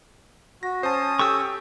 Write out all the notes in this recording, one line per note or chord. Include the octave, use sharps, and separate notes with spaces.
F#4 A#6
C#4 C5 A5 D#6
G4 A4 G5 C#6 E6